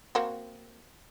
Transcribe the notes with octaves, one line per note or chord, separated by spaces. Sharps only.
A#3 C4 F#4